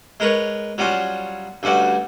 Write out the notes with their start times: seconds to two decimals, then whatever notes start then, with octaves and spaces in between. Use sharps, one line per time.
0.20 G#3 A#4 B4 C#5
0.78 F#3 G3 C#4 F4 F#4
1.63 D2 G2 C#4 F#4 D5